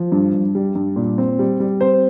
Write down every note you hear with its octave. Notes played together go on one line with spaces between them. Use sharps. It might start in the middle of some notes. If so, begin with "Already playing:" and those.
Already playing: F3
G2
G2
G3
G2
A#2
C4
G3
G3
C4 C5